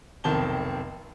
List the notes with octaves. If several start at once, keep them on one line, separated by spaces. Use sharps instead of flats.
F1 B1 D#3 C4 A5 G7